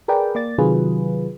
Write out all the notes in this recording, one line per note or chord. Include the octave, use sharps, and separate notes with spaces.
G#4 A#4 B4 D5 G5
A#3 D5 A6
C3 D#3 F#3 F4 G#4 B4